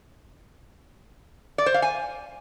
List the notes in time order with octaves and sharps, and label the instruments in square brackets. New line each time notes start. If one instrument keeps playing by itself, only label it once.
[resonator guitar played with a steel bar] D5
C5
F5
G#5